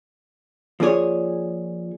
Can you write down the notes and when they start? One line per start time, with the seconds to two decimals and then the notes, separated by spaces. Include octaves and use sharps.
0.80 F3 A#3 D4 G#4 C#5